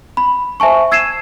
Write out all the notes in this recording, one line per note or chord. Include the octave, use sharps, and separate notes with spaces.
B5
C5 E5 G#5 A5 C#6
E6 G#6 C7 D#7 E7